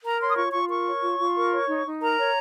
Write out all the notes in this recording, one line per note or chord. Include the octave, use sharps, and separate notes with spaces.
A#4 A#5
C#5 C6
D#6
F4 C#6
F4 C#6
A#4 C#6
C#5
F4
F4
A#4
C#5
D#4
D#4
A#4 A#5
C#5